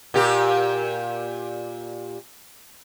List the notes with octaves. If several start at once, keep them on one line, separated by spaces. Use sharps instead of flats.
A#2 G4